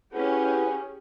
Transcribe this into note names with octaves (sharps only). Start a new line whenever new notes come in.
C#4 E4 G4 G#4 B4 F#5